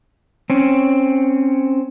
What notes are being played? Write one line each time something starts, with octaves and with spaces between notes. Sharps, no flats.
C4 C#4